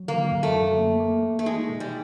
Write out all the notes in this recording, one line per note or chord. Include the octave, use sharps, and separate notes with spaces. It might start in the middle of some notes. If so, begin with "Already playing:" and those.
Already playing: F#3
D3 A#3
F#2
A3
F#2
A#3
A#3
A#3
A3
G#3 D#4
B2
G3